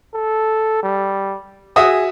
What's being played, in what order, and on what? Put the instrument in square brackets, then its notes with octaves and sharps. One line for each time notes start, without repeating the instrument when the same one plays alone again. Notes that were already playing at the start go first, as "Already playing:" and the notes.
[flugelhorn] A4
G3
[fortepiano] F#4 E5 D#6 [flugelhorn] G#4